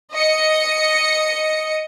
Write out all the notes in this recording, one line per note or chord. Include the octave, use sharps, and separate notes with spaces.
D#5 C#7